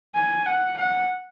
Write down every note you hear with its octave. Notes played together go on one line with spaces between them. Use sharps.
G#5
F#5
F#5